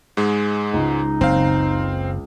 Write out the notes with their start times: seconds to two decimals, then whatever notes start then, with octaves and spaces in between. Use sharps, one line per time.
0.17 G#2 G#3
0.73 C#2 D#4
1.21 F#1 C4 F5